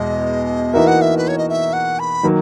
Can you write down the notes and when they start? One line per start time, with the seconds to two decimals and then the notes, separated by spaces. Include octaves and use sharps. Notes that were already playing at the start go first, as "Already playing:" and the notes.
Already playing: E2 B2 G#3 D#5
0.73 E3 A#3 D#4 F#4 A#4 E5
0.87 F#5
1.01 E5
1.17 B4
1.28 C#5
1.38 D#5
1.49 E5
1.73 F#5
1.99 B5
2.23 D#3 F#3 A#3